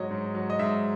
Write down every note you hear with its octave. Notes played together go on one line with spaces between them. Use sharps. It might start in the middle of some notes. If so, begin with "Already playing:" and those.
Already playing: G#2 F#3 C#5 D#5
G#2
F#3
D#5
G#2 E5